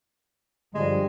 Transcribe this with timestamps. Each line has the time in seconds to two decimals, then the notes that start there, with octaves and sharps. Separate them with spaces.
0.75 G2 D3 F3 G3 G#3